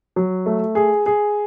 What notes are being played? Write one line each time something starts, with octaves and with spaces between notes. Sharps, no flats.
F#3
A3
G#4
G#4